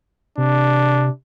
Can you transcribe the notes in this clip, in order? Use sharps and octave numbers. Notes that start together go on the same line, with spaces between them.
C3 D4